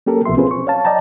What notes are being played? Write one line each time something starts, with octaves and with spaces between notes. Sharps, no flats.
A#3 C#4 G4 A4 A#4
C2 B2 F3 B3 E5 C6
C4 C#4 F4 G#4 B4 C5
C#6
C#5 F5 A5
D5 D#5 G5 A5 A#5